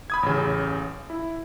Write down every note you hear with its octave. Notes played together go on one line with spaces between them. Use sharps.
B5 D#6 G#6
A1 C#3
E4